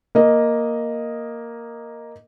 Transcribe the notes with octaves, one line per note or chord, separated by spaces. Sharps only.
A#3 D#5